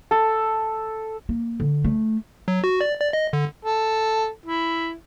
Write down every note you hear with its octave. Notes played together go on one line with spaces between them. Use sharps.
A4
A#3
D3
A3
F#3
F#4
D5
D5
D#5
D3
A4
E4